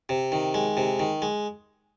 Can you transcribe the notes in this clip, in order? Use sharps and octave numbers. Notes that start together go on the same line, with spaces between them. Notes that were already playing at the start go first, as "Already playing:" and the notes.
C3
D#3
G#3
C3
D#3
G#3